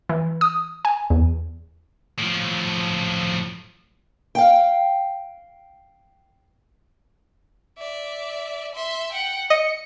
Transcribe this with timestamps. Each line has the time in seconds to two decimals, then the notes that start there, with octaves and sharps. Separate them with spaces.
0.09 E3
0.41 D#6
0.85 G#5
1.10 E2
2.18 A2 F3
4.35 F5 G5
7.78 D5 E5
8.75 E5 C6
9.12 F#5 G5
9.50 D#5 C#7